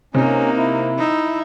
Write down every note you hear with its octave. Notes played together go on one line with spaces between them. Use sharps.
C3 A#3 C#4 D#4
E4
D#4 E5